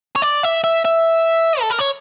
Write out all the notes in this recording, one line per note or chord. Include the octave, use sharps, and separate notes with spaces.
C#5
D5
E5
E5
E5
A4
A#4
C#5